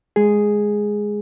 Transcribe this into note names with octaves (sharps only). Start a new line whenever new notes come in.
G#3 G#4